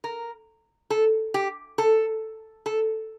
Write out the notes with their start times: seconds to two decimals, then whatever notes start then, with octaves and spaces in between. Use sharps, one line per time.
0.04 A#4
0.90 A4
1.34 G4
1.78 A4
2.66 A4